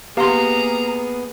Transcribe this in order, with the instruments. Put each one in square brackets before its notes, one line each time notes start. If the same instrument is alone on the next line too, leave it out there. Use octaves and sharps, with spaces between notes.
[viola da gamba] A#3 G#4 [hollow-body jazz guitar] B3 F5 [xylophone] G4 C6 [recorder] A#5